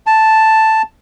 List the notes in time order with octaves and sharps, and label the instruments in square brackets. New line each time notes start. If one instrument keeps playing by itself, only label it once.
[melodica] A5